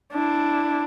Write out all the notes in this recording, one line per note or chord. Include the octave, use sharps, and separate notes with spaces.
D4 E4